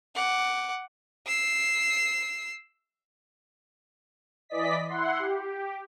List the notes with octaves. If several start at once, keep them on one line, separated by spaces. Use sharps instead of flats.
F#5 D6
E6 C7
E3 D5 D#5 B6
E4 F#5 C6
G4